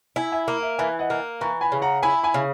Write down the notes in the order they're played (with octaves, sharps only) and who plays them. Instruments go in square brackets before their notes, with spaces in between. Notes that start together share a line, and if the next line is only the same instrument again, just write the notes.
[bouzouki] E4 [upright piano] E5 G#5
[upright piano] E5 G#5
[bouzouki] A#3
[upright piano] E5
[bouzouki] E3 [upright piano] E5 G#5
[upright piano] D#5 F#5
[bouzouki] A#3
[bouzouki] E3 [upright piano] A#5 C#6
[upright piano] G#5 B5
[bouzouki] C#3
[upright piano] F#5 A#5
[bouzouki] E4 [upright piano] G#5 B5
[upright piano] G#5 B5
[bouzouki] C#3